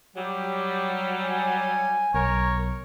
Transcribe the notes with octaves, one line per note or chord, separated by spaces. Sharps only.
F#3 G3 G4
G#5
B1 A#4 C#5